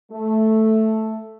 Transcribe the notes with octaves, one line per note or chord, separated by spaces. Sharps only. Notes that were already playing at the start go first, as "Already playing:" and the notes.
A3